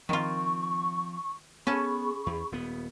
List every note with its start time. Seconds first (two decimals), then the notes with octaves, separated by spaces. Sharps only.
0.09 D#3 F3 C4 F4 C#6
1.67 B3 C#4 G#4 A4 A5 B5 C#6
2.26 E2
2.52 D#1 B3